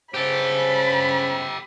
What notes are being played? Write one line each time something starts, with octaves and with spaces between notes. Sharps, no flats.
C#3 G4 A4 C5 B5